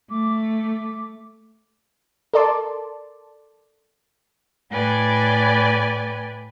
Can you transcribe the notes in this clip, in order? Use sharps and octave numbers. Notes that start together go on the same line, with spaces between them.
A3 D6
A4 A#4 D5 A5 C6 D6
A2 B4 D5 G5 G#5